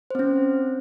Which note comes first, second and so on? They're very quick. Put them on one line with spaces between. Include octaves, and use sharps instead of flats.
C5 C4 C#4